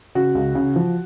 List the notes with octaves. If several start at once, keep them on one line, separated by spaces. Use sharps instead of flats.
C#3 F#4
C#2
C#3
F3